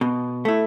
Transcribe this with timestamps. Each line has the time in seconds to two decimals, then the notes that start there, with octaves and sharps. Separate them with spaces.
0.01 B2
0.45 A3 E4